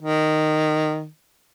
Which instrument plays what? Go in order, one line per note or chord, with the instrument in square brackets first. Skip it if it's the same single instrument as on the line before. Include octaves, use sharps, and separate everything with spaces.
[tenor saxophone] D#3